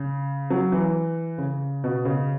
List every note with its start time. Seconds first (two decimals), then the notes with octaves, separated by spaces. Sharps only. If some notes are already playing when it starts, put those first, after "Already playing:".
Already playing: C#3
0.50 F#3
0.72 E3
1.38 C#3
1.84 B2
2.05 C#3